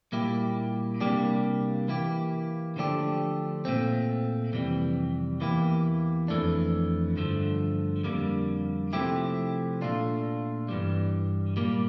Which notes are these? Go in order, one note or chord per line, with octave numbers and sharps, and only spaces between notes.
A#2 G3 A#3 E4 G4
C3 G3 A#3 D4 G4
E3 A#3 E4 G4
D3 F3 A3 D4 G4
A#2 A3 C4
F2 C3 E3 G3
E2 E3 A#3 E4 G4
F2 E3 A3 D4
G2 D3 F3 A3
F2 D3 G3 A#3
C3 F3 A3 E4 G4
A#2 A3 D4 F4
G2 E3 G3
A#2 G3 A#3